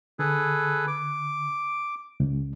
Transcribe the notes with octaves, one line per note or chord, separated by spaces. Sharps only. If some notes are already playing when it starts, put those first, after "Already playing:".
D3 G#4 A4 B4
D6
C#2